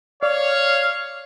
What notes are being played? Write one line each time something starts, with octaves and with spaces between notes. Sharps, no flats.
C#5 D5 F5